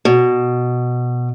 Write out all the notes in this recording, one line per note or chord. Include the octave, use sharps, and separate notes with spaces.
B2